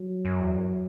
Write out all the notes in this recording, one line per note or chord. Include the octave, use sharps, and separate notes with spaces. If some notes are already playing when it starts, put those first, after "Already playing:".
Already playing: F#3
F#2
E2
F#2